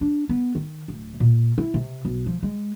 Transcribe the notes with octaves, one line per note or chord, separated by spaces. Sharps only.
D4
B3
D#3
D1
A#2
E4
C3
B1
F3
G#3